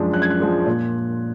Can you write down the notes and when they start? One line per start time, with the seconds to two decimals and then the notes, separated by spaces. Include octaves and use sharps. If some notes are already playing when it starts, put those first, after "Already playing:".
Already playing: F#2 F3 G#3 D4
0.13 F#2 F#6
0.22 G#6
0.30 F#6
0.40 F3 G#3 D4
0.67 A#2